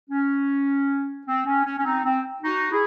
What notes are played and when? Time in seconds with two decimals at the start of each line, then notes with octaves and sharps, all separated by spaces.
0.10 C#4
1.26 C4
1.45 C#4
1.65 C#4
1.78 C#4
1.84 C4 D#4
2.04 C4
2.42 D#4 F#4
2.71 E4 G#4